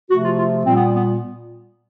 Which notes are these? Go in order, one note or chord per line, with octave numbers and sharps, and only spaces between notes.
C3 F3 A3 F#4
F4
F4
A#2 G3 C4
B3
B3